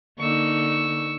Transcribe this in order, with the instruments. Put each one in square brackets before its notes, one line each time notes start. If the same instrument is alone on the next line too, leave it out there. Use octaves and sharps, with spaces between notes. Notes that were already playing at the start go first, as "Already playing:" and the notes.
[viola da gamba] D3 A#3 D#4 [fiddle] C#6 E6